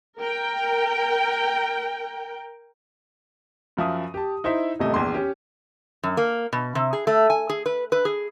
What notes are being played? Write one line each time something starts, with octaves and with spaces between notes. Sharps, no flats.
A#4 G5
F#2 F3 E5 D#6
G4 A5
D#4 E4 C5 E5
D#1 A1 C3 A3 D#5
A#1 E2 C6
C#4 G4
F#2
A#3
B2
C3
G#4
A3
G#5
G#4
B4
B4
G#4